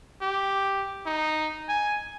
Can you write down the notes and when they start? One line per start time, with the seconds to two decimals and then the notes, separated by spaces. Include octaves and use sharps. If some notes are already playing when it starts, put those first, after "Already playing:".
0.21 G4
1.06 D#4
1.69 G#5